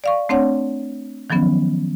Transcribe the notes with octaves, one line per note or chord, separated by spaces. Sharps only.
D5 F5 C#6
A3 C4 D4 C#5 F#5
D#3 F3 F#3 B3 C#4